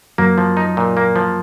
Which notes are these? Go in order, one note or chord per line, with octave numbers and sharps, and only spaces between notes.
F#2 F#3 A#3
F3
D#4
A#2
A#3
F3